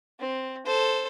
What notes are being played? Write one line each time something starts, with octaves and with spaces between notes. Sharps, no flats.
C4
A4 C5